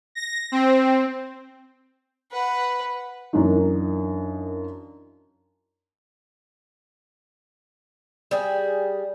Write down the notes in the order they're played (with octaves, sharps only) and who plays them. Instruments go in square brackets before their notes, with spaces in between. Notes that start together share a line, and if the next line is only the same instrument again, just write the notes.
[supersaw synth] A#6
C4
[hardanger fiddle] B4 F#5
[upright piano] F#2 E3 A#3 D4 D#4
[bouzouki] G3 G#4